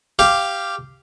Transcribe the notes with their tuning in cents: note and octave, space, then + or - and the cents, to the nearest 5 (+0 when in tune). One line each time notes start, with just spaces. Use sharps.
G4 +0 F5 -10